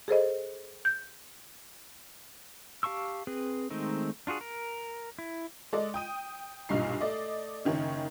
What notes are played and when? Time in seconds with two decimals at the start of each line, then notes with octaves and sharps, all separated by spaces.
0.08 G#4 A4 C5 D#5
0.85 G6
2.83 G4 F5 A5 C#6 E6
3.27 C4 G#4 B4
3.70 D#3 G#3 A3 C4 D#4
4.27 D4 F4 F#4 G#4
4.41 A#4
5.19 E4
5.73 G#3 A4 D5 D#5
5.94 G5 D#6 D#7
6.69 B1 G2 A#2 D#4 C7
7.01 A3 D5 D#5
7.65 F#1 D#3 C#4